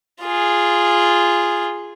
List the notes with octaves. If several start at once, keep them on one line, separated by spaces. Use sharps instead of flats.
F4 G#4